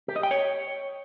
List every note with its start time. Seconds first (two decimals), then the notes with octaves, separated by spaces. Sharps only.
0.08 G4
0.16 D#5
0.23 G5
0.31 C#5